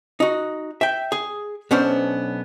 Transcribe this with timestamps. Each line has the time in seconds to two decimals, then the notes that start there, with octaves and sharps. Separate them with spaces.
0.20 D#4 F#4
0.81 E5 G5
1.12 G#4
1.71 B1 B3 C#4 D4 C5